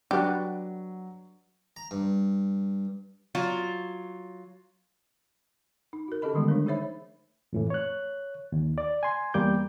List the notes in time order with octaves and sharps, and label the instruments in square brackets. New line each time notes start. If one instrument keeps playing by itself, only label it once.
[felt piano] F#3 [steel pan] D4 F#4 B4 [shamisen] G4
[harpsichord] A#5
G2
[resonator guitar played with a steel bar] F#3 F4
[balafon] D#4
F#4 A#4
C#4 G4 A4 D#5 B5
D3 D#3 G3 G#3 B3
F3 A3 D4 A#4
D#4 G#4 C5 C#5 E5 B5
[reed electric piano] F2 A2 E3
C#5 F#6
D#2
D5
G#5 C6
E2 G3 A#3 D6 G6